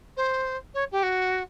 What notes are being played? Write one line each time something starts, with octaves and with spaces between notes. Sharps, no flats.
C5
C#5
G4
F#4